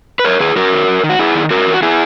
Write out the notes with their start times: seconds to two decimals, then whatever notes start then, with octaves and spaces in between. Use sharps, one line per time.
0.19 B4
0.25 F#2 A#4 C#5
0.40 D#3 G#4 B4
0.56 F#2 F#4 A#4
0.72 D#3
0.88 F#2
1.04 D#3
1.10 F#4
1.19 F#2 E4 G#4
1.35 D#3
1.50 G#2 F#4 A#4
1.66 E3
1.74 F#4
1.83 E4 G#4